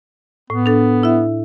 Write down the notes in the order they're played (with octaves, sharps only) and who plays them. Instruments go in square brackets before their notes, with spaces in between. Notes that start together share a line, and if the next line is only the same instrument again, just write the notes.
[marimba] A2 [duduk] B3
[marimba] D4 A4
E4 E5